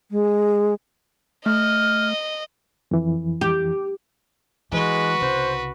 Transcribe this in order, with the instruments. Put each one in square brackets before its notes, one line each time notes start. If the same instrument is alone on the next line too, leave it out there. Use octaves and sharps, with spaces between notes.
[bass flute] G#3
[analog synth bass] A3 [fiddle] D#5 [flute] F6
[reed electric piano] F2 E3
[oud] G4
[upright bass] E3 [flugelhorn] G#3 [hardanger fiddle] F#4 B4
[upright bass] C2 C#3 [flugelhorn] C5